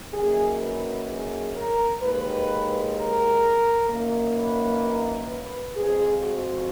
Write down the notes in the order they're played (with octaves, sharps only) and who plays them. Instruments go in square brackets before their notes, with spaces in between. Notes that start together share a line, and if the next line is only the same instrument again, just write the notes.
[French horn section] F#2 D#3 F#3 A#3 G#4
B4
G#4
A#4
D#2 D#3 G#3 B4
A#4
F#2 D#3 A#3
B4
B4
F2 F3 G#3 G#4
F#4